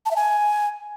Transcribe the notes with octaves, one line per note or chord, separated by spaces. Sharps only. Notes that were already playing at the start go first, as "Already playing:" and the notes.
A5
E5
G#5